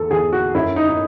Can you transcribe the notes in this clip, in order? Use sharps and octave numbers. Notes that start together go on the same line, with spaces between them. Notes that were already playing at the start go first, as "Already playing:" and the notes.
Already playing: E2 A4
E2 G#4
F#4
F#2 E4
D#4
D#4